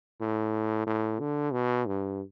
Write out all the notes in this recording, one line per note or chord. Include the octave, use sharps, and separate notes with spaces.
A2
A2
D3
B2
G2